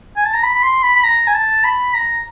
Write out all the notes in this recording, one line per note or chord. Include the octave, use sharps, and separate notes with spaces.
G#5
A5
A#5
B5
B5
C6
B5
B5
A#5
G#5
A5
B5
A#5